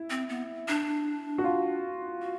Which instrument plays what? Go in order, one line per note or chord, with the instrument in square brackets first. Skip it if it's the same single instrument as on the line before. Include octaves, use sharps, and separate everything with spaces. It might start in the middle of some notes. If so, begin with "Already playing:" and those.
Already playing: [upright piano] E4
[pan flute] C4
B3
D4
[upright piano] F#4
F4
[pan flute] F#4